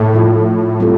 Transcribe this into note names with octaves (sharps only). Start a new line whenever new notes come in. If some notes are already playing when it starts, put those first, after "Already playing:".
Already playing: A2
F3 A3 F4 A4
G3 C4 F4 A4